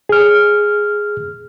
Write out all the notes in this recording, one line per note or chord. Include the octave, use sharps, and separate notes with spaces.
G#4 F6